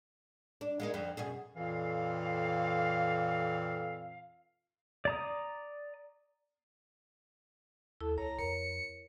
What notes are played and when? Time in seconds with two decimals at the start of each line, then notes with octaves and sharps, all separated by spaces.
0.61 D4
0.80 G#3 A#3 D#4
0.94 F2 D3
1.17 F#2 B2 G#4
1.57 F2 A#2 E3 A4 F5
5.05 D5 A#5 D#6
8.01 D#2 E4 A4
8.18 C#2 C#5 A#5
8.39 F2 A#4 C#5 C#7